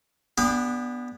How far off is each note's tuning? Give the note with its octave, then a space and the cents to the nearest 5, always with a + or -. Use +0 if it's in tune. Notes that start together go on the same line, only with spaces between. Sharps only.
B3 -5 D4 +0 G4 +45